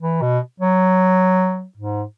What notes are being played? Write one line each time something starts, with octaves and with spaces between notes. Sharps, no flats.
E3
B2
F#3
G#2